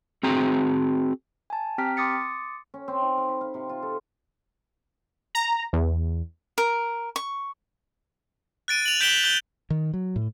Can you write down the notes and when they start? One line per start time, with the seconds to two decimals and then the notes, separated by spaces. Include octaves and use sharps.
0.23 C4 F#4 G#4 A#5
1.50 G#5 A5
1.78 C4 G4 G5 A#5 F6 B6
1.97 C6 D6 D#6 A6 C#7
2.74 C#4
2.88 C4
3.01 D#4
3.18 F5
3.29 B5
3.41 F5
3.54 C3
3.69 F4
3.83 A4
5.35 A#5
5.73 E2
6.58 A#4
7.16 C#6
8.68 F#6 A6 D7 D#7
8.86 F7 F#7
9.01 G6 B6 D7 E7 F#7 G7
9.24 G6 G7
9.70 D#3
9.94 F#3
10.16 A2